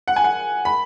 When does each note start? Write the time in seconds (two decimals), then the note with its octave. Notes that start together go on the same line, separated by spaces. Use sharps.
0.08 F#5
0.16 G#5
0.24 F#5
0.65 B5